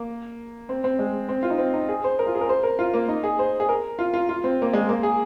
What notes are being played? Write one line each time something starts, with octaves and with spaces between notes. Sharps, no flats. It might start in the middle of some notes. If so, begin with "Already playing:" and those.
Already playing: A#3
C4
C4
G#3
C4
F4
D#4
C4
D#4
G#4
C5
A#4
F4
G#4
A#4
C5
A#4
F4
A#3
D#4
G#4
C5
G#4
A#4
F4
F4
F4
C4
A#3
G#3
A#3
G#4